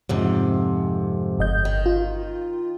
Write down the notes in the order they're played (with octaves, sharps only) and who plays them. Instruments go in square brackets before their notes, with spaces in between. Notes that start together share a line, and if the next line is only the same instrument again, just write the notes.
[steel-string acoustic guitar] F2 G#2 C3
[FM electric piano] G1 D#5 G6
[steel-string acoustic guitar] D#3
[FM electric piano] F4